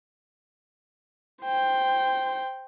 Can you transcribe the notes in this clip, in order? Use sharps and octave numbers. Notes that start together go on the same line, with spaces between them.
C5 G5